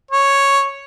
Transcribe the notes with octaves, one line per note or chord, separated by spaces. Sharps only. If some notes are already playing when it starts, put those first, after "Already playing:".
C#5